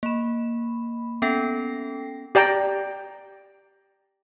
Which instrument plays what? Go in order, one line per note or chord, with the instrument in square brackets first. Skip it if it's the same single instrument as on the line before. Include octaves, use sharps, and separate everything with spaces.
[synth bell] A#3 B5
B3 C#4 A4 G5 A#6 C7
[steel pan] G4 D5 G5 A#5